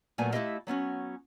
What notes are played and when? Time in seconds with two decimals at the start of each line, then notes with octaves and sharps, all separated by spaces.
0.18 A#2 F#3 A3 B3 G#5
0.32 A3 E4 F#4 G4 D#5 F5
0.67 F#3 B3 C#4 F#4